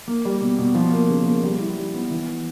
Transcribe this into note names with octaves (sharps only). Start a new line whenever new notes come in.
A#3
G3
B2
B2
F3
A#3
C#3
A#3
G3
E4
G3
B3
E3